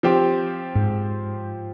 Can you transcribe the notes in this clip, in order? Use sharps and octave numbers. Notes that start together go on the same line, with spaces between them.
F3 C4 G4
G#2